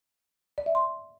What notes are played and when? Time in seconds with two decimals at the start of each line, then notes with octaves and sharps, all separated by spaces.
0.58 D5
0.66 E5
0.75 C6